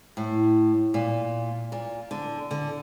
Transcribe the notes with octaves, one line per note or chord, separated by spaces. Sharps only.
A2
A#2
A#2
D3
D3